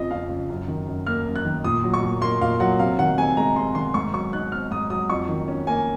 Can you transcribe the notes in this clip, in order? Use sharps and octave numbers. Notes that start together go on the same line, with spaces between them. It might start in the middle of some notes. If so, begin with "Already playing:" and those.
Already playing: F2 C#3 F3 C4 D#5
F2 F5
C#3
F#2
D#3
F#2
A#3 F6
F#2
F#6
D#3
A#2 D#6
F#3
C#6
A#2
A#3 C6
A#2 F5
F#3 F#5
C3 F5
D#3 F#5
C3 G#5
G#3 A#5
C3 C6
D#3 C6
G#2 C#6
F#3 C#6
D#4 F#6
C4 F6
G#2 D#6
F#3 D#6
F2 C#6
D#3
C#4
A#3 G#5